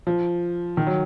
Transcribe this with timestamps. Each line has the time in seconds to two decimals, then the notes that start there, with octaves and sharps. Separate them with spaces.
0.07 F3
0.77 D#3
0.87 F#3